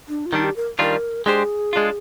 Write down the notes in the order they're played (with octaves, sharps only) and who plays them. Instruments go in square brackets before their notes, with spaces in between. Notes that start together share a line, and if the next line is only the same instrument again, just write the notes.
[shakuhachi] D4
F4
[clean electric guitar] D#3 G3 D4 [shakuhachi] D#4
[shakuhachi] G4
A#4
[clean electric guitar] D#3 G3 D4 F4 [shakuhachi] A#4
[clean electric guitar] G#3 D4 G4 C5 [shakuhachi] G#4
[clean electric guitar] G#3 D4 F4